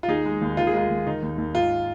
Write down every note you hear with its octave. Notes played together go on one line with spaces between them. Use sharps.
F4
D#2 D#4 G#4
G#3
D#2
D#3 F4
G#4
G#3 F4
D#2
D#3 D#4
D#2
D#2
G#2 F4